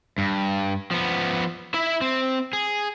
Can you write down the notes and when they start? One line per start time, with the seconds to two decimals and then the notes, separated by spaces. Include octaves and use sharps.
0.18 G2
0.91 F3 B3
1.74 E4 E5
2.01 C4
2.53 G#4